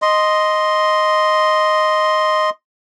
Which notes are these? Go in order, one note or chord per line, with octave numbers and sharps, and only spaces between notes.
D#5 C6